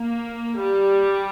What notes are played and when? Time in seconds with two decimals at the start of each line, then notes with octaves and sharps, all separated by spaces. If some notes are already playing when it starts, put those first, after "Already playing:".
Already playing: A#3
0.59 G3